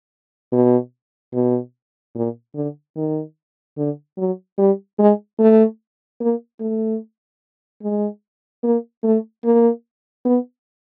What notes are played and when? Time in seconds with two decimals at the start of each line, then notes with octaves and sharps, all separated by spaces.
0.52 B2
1.33 B2
2.15 A#2
2.55 D3
2.96 D#3
3.77 D3
4.17 F#3
4.58 G3
4.98 G#3
5.39 A3
6.20 A#3
6.60 A3
7.82 G#3
8.63 A#3
9.04 A3
9.44 A#3
10.25 B3